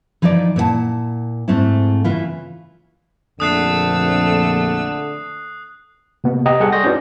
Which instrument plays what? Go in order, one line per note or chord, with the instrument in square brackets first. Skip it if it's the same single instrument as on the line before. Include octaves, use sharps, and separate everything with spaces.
[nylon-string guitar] E3 F3 D#4 E4 D5
A#2 E4 B4 F#5 A5
G#2 A3 C4 E4
C#3 E3 E4 F4
[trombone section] A#1 F2 [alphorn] D3 [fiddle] A3 E6 [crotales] D#6 F#6 C7
[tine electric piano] C3 A#3 B3
G4 D#5 F#5 G5 A#5 D#6
G3 G#4 A4 F#5
D5 C6 C#6 D#6 G6 A#6
C#4 D#4 E4 F#4 B4 D5